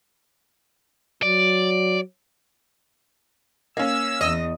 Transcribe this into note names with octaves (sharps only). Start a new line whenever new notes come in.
F#3 D5
A#3 C#4 E6
E2 D#5